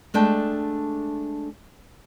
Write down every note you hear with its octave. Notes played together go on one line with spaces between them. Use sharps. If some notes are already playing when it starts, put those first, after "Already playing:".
G#3 A3 D4 G5 A5